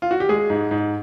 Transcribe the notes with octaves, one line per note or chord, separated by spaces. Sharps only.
F4
F#4
G4
G#3 G#4
G#2
G#2